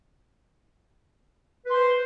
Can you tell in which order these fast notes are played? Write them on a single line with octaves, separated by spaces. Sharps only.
B4 C6 C5